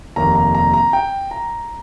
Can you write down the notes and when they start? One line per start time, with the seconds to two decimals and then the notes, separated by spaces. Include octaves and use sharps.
0.16 F1 D#2 D#3 A#3 A#5
0.35 A#5
0.55 A#5
0.74 A#5
0.93 G5
1.31 A#5